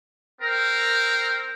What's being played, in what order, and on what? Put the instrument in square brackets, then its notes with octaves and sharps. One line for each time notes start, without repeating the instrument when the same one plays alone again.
[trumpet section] C4 A#4